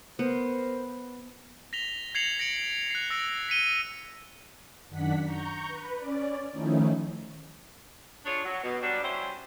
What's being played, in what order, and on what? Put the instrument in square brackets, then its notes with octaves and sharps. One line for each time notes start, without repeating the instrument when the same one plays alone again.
[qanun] B3 [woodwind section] A#4 C5
[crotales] A#6 B6 F7 G7
G#6 A#6 C7 C#7 F7 F#7
A#6 C#7 D7 F#7
F#6 C7
E6 A#6 D7 F7
B6 C#7 D#7 G7
[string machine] F#2 D#3 D4 F#5 B6
A#5 C#6 G6
B4
C#4 D5
D#3 F3 A3 C#4 D#4 E4
[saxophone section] D4 F4 G#4 C#5
F#3
B2
F#3 G3 D4
G3 C#4 E4 F#4 G4 C5